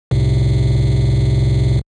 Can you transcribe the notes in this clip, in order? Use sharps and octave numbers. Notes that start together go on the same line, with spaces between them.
C2 A2 C3